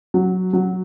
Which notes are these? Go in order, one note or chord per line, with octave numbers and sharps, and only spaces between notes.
F#3
F#3